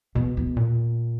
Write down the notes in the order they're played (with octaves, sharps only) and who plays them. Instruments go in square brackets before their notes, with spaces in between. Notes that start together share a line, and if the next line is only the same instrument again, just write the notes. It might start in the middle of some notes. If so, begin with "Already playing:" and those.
[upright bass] E2 [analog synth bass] B2
[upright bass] E2
[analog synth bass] A#2